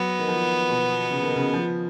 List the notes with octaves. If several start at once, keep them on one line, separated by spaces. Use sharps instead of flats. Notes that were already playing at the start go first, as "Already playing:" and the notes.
Already playing: F#3 B3
D#3
F3
B2
C#3
D#3
C#3
F3